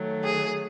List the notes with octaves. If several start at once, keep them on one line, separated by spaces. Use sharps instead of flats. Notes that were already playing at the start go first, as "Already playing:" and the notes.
Already playing: D#3 F#3 A3
G#4